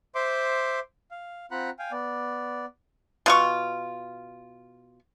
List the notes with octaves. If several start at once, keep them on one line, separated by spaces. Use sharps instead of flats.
C5 E5 C6 D6
F5
C4 F4 F#5 A#5 B5 F#6
F5 G5 G#5
B3 D5
B2 F4 C#6